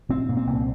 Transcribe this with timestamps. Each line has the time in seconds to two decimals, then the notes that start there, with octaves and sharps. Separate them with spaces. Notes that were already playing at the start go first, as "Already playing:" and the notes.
0.09 A#2 C4
0.29 A#2
0.37 C4
0.47 C2